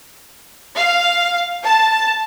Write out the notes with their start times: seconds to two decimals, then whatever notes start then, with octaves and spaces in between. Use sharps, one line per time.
0.77 F5
1.64 A5